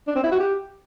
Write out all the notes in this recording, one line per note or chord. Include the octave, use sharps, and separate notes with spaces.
D4
C4
E4
F#4
G4